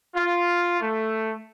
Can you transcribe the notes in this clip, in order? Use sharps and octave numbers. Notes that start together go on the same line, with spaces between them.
F4
A3